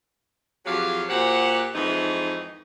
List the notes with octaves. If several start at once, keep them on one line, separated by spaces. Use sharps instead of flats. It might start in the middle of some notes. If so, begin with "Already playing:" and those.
F2 F#3 G4 G#4 F5
A#2 F#4 G4 C5 F#5
F2 G#2 E3 D#4